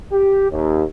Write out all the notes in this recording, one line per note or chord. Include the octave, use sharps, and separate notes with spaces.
G4
D#2